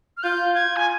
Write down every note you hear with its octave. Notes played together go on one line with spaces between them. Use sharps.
F6
F4 G6
F4 G#6
G#5